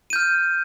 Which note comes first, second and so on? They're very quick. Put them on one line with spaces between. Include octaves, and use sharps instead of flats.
D#7 G6 F6